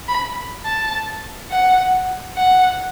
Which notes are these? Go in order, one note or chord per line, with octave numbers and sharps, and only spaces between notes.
B5
A5
F#5
F#5